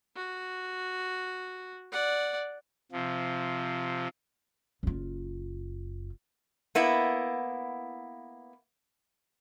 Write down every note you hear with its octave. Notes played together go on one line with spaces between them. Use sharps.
F#4
D5 F#5
C3 F3
F#1 F4
A#3 B3 E4